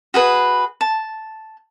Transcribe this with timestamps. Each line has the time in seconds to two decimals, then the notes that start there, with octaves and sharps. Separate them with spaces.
0.14 F#4 G#4 B4
0.81 A5